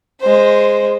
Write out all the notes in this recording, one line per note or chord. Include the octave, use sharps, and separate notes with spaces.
G#3 C5